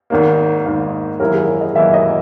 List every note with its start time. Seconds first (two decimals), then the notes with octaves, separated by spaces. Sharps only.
0.10 G#1 G#2 D#3 A#3 A#4
0.65 G#1 G#2 D#3 A#3
1.20 G#1 F#2 E3 A#3 E4 A#4
1.34 G#4
1.48 A#4
1.61 D#5
1.75 G#1 F#2 E3 A#3 E4 E5
1.94 D#5